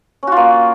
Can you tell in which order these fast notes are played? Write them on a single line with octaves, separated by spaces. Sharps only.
C#4 F#4 F4 A#3